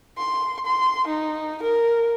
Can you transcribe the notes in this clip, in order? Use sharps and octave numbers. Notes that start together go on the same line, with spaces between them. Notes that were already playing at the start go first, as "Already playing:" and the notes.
C6
C6
D#4
A#4